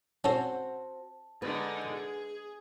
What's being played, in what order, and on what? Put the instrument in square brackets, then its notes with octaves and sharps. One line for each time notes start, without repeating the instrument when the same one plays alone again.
[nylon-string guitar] C4 F#4 C5 [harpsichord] C#4 A4 [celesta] A5
[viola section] D3 G#3 D#4 [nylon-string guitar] B4
[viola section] G#4